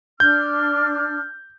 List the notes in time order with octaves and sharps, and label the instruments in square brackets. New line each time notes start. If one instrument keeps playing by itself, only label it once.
[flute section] D4 F6 [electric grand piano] G6